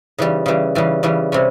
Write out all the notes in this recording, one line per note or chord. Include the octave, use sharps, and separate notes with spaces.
C#3 E3 G3
C#3 E3 G3
C#3 E3 G3
C#3 E3 G3
C3 G3 C#4